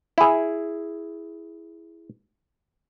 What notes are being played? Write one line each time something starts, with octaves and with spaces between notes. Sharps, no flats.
E4 G#4